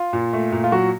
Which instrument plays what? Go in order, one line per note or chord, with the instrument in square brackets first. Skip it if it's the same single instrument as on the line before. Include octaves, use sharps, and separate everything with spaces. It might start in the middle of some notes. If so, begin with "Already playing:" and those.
Already playing: [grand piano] F4
[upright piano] A#2
A3
A#2
[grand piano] F4
[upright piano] F#3 [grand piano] F#4